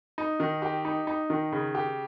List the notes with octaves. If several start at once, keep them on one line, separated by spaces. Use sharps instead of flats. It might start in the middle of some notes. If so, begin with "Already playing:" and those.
D#4
D#3
G4
D#4
D#4
D#3
C#3
G4